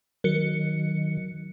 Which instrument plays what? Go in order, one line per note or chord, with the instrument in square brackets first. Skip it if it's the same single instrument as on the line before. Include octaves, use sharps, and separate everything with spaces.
[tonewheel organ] D#3 [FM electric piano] F#3 C#7